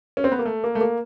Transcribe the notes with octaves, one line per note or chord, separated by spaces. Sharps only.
C#4
C4
B3
A#3
A3
A#3
A3
A#3